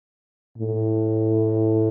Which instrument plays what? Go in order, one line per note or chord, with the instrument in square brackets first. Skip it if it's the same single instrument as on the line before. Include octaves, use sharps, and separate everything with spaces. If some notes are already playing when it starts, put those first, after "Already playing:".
[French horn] A2